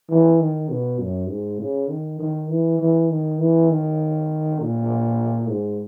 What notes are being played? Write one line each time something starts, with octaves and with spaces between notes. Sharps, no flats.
E3
D#3
B2
F#2
G#2
C#3
D#3
D#3
E3
E3
D#3
E3
D#3
A#2
G#2